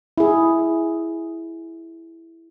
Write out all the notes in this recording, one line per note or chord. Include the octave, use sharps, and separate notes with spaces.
E4 G#4